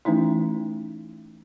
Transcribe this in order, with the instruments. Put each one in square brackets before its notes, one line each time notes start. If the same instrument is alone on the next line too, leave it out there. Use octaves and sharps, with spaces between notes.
[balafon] E3 A3 C#4 D#4 E4